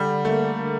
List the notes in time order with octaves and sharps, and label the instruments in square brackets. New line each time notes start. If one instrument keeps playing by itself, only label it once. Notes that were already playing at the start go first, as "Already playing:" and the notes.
Already playing: [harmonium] D3 [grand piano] G3
[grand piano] A3 [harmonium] A#3
[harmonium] D3